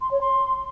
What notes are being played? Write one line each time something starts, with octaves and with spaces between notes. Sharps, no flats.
C6
C#5
C6